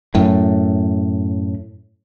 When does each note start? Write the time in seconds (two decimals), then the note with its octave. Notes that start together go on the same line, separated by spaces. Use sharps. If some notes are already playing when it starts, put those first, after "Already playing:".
0.15 F#2 A2